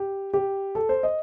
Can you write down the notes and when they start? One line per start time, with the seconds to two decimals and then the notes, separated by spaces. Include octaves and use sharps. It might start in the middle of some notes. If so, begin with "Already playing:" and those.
Already playing: G4
0.34 G4
0.75 A4
0.89 C5
1.03 D#5